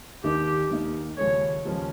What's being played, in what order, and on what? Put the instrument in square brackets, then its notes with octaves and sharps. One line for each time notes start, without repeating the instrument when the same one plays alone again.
[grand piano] D#2 D#3 A#3 D#4 [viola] G4
[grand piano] D#2 D#3 A#3 D#4
[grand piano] D#2 C#3 F3 G#3 C#4 [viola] C#5
[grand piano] D#2 C#3 F3 G#3 C#4